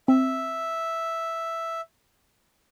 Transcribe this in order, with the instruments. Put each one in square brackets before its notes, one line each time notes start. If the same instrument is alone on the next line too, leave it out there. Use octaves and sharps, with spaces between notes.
[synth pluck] C4 [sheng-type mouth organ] E5